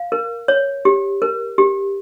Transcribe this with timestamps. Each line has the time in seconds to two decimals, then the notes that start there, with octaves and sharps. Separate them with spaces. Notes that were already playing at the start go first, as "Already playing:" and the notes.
Already playing: F5
0.12 A#4
0.48 C#5
0.85 G4
1.22 A#4
1.58 G4